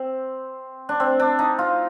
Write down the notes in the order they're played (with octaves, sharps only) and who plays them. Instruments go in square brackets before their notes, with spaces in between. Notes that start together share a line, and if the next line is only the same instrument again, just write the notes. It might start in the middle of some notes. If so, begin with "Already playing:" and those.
Already playing: [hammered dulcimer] C4
D4
C4
D4
D#4
F4